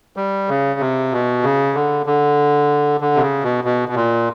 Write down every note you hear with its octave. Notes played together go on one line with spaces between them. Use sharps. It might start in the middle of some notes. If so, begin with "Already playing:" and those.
G3
C#3
C3
B2
C#3
D3
D3
D3
C3
C#3
B2
B2
B2
A#2